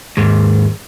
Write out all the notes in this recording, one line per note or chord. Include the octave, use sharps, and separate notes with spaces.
D#2 G#2